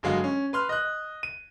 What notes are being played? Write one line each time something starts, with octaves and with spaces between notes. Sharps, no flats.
G1 F#3 G#3 F5
C#4
B4 C6 F6
D#5 F#6
D#7